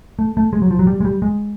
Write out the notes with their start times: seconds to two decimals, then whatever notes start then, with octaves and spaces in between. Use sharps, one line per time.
0.19 A3
0.37 A3
0.53 G#3
0.62 F#3
0.71 F3
0.79 F#3
0.87 G3
1.01 G#3
1.05 G3
1.22 G#3